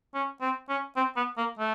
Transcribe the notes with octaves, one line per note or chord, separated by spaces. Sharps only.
C#4
C4
C#4
C4
B3
A#3
A3